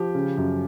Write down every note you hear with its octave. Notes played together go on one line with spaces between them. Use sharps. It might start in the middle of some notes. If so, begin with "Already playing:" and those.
Already playing: F3 G4
C#3
F#2